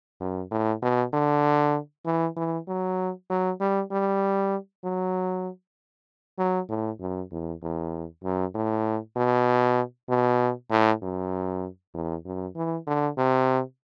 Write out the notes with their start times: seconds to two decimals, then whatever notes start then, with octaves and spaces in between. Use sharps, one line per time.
0.21 F#2
0.52 A2
0.83 B2
1.13 D3
2.06 E3
2.37 E3
2.68 F#3
3.30 F#3
3.61 G3
3.91 G3
4.84 F#3
6.39 F#3
6.69 A2
7.00 F#2
7.31 E2
7.62 E2
8.24 F#2
8.55 A2
9.17 B2
10.09 B2
10.71 A2
11.02 F#2
11.94 E2
12.26 F#2
12.56 E3
12.87 D3
13.18 C3